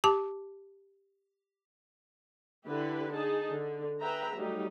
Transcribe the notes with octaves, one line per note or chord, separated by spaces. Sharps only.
G4 A5 D6
D3 E4 G4 B4
D#4 G#4 A5
D3
G#4 B4 E5 G5 A#5
F#3 G3 A3 D#4 G4